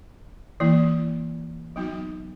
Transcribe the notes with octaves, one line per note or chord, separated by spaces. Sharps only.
E3 A#3 E4
F#3 B3 D#4 F#4